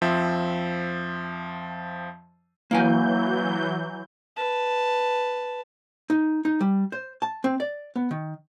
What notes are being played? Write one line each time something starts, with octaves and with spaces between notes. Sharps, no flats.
F2 F3 C4 E5
E3 F#3 A#3 E4 G#5 G6
B4 A5
D#4
D#4
G3
C5
A5
C4
D5
B3
D#3